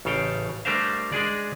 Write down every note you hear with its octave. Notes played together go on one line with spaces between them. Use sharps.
A1 C#3 A4 F5 G5
G3 A3 D4 A#4 C5 F5
G#3 D4 G#4 D5